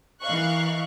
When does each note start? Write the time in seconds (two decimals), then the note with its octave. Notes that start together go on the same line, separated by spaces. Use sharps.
0.22 E3 A#4 D#5 F5 C#6 F#6